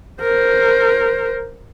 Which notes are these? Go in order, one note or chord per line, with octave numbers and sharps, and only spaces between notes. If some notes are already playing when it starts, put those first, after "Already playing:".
A#4 C5